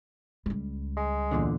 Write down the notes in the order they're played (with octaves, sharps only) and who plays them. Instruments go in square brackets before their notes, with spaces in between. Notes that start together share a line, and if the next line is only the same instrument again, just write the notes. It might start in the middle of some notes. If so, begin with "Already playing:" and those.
[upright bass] C#2 G3
[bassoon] G#3
[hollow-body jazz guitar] E2 A#2 D3